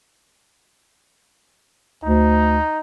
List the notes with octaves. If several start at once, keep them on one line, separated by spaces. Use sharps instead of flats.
D2 D#4